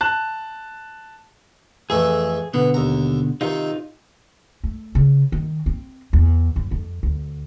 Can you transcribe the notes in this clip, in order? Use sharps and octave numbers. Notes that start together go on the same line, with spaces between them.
A5 F#6
F2 E3 A3 G#4
B2 D3 B3
D#2 A#5
C3 D#3 D#4 F4
A3
C#3
D#3
C4
E2
F#2
F2
D2